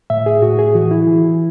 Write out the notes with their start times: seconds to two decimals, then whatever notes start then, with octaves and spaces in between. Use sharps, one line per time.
0.10 A2 E5
0.26 G#4
0.42 A2 F#4
0.59 G#4
0.75 E3 F#4
0.91 E4
1.07 E3